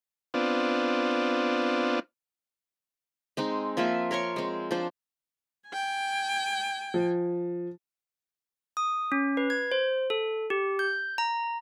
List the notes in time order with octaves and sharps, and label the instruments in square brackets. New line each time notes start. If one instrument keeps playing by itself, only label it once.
[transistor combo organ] B3 C4 D4 F4
[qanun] G#3 C4 D#4
F3 A#3 F4 E5
A#4 C#5 C6 C#6
G#3 C4
F3 D4 C5
[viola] G5 G#5
[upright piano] F3
[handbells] D#6
C#4
B4
G#6
C5
A4
G4
G6
A#5